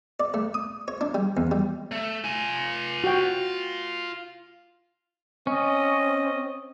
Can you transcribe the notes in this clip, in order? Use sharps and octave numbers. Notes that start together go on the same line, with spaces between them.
D5
A3
D#6
C#5
D4
G3
E2
G3
A3
F4 G#5
F#4 G5
C4 C#4 D#5